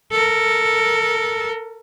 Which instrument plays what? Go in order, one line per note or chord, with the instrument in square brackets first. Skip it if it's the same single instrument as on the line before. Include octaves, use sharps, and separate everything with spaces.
[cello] A4 A#4